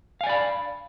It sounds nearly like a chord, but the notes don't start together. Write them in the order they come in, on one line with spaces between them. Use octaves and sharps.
F5 G#5 D5 B5